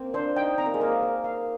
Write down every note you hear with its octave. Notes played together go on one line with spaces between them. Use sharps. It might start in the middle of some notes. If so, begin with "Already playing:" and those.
Already playing: A#3 C4
D4 C5
D#4 G5
C4 A#5
A#3
G#3
A#3 A#4
A#4
F5